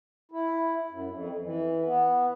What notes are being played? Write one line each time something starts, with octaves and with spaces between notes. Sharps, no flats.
E4
F#2
F2
E3
B3